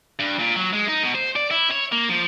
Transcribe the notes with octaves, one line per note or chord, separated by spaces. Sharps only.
G2
A#2
F#3
G#3
D#4
B2
C5
D5
E4
C#5
A#3
F3